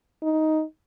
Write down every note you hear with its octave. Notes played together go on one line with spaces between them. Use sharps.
D#4